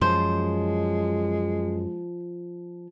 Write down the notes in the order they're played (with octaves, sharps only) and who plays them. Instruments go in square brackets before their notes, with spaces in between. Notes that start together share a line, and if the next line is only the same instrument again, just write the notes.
[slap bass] F#2 [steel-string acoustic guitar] F3 [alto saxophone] G#3 [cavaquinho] C5